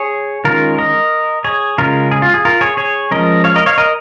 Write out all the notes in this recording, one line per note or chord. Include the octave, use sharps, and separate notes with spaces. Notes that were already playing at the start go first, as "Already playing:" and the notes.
Already playing: G#4 C#5
D#3 G#3 C#4 F4 A#4
A#4 D#5
G#4 C#5
C#3 G#3 C#4 F4 A#4
G#4
F4
G#4
F4 A#4
G#4 C#5
G#4 C#5
F3 G#3 C#4 A#4 D#5
C#5 F5
A#4 D#5
C#5 F5
A#4 D#5